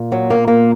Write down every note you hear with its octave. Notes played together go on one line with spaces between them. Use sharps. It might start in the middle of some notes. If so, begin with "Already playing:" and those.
Already playing: A#2
F#3
A#3
A#3